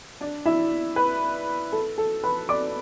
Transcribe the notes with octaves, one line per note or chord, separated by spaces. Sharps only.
D4 D5
E4 E5
B4
A4
A4
B4 B5
D5 D6